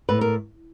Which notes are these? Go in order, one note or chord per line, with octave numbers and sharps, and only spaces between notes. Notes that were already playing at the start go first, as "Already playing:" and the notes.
A2 B4
A#4